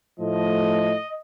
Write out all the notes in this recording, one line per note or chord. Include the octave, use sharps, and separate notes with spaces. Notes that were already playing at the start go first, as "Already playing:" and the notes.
A2 F3 A3 D#5